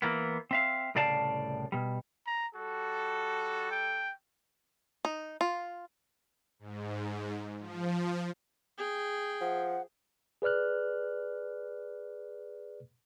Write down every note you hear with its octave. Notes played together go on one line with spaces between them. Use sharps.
E3 A#3 B3
C4 E5 F5
C2 A2 C#3 D5 F5 A5
B2 G3
A#5
G3 F#4 A4
G5
D#4
F4
G#2
F3
G#4 G5
F3 F#5
G#4 B4 D5 F6 F#6